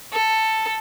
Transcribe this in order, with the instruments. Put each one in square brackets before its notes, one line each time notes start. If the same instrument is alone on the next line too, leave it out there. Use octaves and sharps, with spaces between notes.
[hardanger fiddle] A4